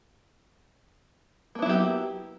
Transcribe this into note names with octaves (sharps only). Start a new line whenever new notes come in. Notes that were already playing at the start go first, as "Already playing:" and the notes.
F#3 A#3 B3 E4 G4